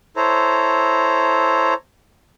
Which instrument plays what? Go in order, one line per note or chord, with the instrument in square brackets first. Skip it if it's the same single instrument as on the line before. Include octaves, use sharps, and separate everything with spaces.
[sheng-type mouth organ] E4 A4 C5 C#5 A#5